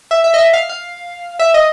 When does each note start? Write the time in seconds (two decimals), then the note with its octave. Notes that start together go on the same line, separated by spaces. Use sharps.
0.11 E5
0.24 E5
0.34 D#5
0.38 E5
0.53 F5
0.69 F5
1.39 E5
1.54 D#5